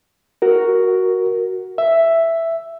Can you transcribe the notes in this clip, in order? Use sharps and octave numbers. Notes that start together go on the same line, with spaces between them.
F#4 A#4
E5